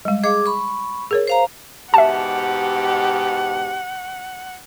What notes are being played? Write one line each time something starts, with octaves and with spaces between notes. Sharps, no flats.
G3 G#3
G#4 D#5 F5 D6
B5 C#6
G#4 A#4 C#5
C5 F5 A#5
G#2 B2 G4 E5 F#5 A5